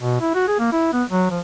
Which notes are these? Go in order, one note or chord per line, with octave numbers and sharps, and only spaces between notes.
B2
E4
F#4
G#4
A#3
E4
B3
F#3
F3